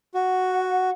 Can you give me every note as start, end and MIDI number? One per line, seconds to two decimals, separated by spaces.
0.15 0.90 66
0.15 0.93 78